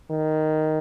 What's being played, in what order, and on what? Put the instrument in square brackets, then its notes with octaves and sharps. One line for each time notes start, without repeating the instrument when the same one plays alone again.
[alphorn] D#3